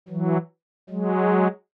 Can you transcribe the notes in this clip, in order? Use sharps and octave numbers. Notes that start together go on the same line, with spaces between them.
E3 F#3
F#3 G#3